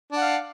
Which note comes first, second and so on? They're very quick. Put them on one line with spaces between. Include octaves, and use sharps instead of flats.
D4 F#5 F5